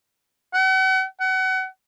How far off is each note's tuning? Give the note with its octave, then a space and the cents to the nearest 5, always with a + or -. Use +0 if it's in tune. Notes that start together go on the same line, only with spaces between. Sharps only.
F#5 +40
F#5 +30